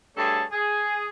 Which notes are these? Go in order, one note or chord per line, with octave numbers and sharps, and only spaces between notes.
G2 A3 G#4 A4 C#5 A5
G#4